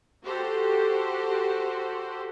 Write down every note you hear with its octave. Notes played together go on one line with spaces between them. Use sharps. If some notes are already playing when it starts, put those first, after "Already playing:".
F#4 G4 A4 C5